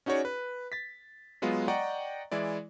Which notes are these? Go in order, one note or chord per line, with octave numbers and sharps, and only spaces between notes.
C#4 D#4 F#4 G#4 C#5 D5
B4
A6 B6
F#3 G#3 B3 F4
D5 D#5 F#5 G5 A#5 C#6
E3 G#3 E4 D5